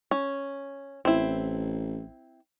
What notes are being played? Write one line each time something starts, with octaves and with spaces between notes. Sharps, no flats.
C#4
A1 C4 E4